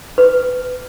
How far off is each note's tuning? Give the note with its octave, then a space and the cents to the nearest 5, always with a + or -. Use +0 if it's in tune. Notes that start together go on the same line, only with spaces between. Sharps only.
B4 +15